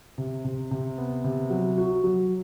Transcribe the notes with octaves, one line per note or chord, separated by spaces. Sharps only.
C3
C3
C3
B3
C3
F#3
F#4
F#3